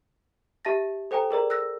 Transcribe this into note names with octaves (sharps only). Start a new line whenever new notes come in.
G4 E5 A5 A6 A#6
A4 C5 G5 G#5 A#5
G#4 A#4 D5 A#5
E6 F#6 A#6